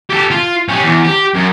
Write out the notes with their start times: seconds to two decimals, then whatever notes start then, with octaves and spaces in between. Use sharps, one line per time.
0.10 G4 A4
0.31 F4
0.69 C#4 G4
0.83 E2
1.05 G4
1.35 F#2